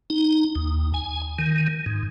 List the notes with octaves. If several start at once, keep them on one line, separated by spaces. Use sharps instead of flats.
D#4
D#2
G#5
D#3
G#2